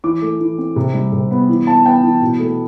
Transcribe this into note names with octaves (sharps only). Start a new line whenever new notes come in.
E3 D6
A3
E3
C4
C3
G3
C3
B3
E3
B3 A5
B3 G5
E3
B2
A3